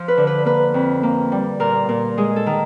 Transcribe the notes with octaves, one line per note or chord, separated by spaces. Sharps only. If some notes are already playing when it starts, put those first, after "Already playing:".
Already playing: F3
B4
D3
B4
A#3 B4
F2
A#3
G3
A#2 A#4
A#2
G#3 G#4
A4
D#3